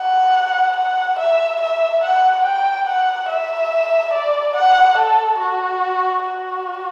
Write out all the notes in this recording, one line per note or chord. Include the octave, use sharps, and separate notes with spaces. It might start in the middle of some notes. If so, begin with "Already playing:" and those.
Already playing: F#5
F#5
E5
E5
F#5
G5
F#5
E5
D5
F#5
A4
F#4
F#4